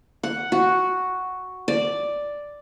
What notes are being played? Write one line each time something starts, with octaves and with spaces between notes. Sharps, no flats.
F#5
F#4
D5